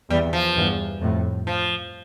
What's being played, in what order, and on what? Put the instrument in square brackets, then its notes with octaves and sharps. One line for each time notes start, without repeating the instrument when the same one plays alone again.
[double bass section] E2 [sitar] G3
[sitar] F3
[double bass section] E2 G2
F2 A2
[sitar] F3